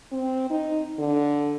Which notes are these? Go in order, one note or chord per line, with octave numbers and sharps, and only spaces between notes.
C4
D#4
D3